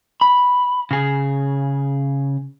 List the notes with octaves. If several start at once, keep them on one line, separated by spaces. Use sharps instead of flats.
B5
C#3 G#4